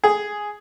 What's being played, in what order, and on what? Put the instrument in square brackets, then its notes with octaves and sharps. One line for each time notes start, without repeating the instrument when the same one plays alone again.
[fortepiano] G#4